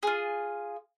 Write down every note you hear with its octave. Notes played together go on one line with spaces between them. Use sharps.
F4 G#4